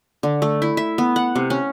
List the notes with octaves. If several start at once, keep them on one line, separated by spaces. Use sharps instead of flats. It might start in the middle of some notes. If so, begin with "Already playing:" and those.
D3
A3
E4
E5
B3
F#5
C3
C#4